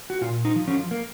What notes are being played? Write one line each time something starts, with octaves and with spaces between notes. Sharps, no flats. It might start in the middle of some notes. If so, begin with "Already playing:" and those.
F#4
A#2 F4
D#4
F3
C#4
A#3